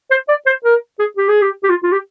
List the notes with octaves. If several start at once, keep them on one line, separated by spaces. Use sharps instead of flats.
C5
D5
C5
A#4
G#4
G4
G#4
G4
G4
F4
F4
G4